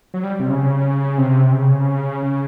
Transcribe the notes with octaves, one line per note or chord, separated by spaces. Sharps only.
F#3
G3
C3
C#3
C3
C#3
C#3